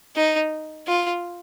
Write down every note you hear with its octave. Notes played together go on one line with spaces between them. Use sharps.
D#4
F4